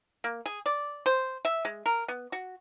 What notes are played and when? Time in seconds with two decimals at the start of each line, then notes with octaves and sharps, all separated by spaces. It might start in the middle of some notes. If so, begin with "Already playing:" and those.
0.24 A#3
0.46 G#4
0.66 D5
1.06 C5
1.45 E5
1.65 G#3
1.86 A#4
2.08 B3
2.32 F#4